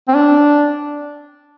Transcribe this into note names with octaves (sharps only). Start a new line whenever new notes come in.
C4
D4